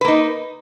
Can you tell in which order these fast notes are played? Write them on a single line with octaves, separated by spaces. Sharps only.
B4 A#3 D#4